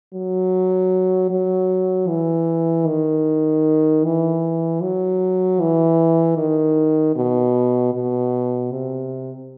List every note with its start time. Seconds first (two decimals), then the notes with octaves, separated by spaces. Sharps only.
0.14 F#3
1.31 F#3
2.09 E3
2.87 D#3
4.04 E3
4.82 F#3
5.60 E3
6.37 D#3
7.16 B2
7.94 B2
8.72 C3